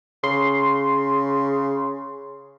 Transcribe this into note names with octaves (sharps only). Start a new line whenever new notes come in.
C#3 C6